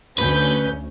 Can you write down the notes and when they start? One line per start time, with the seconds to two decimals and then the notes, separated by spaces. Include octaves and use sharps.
0.18 D2 C#4 B4 G6